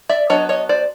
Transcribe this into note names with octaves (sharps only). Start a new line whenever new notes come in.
D5 E5
F#3 B3 D4 C#5 D#5
C#5 D#5
C5 D5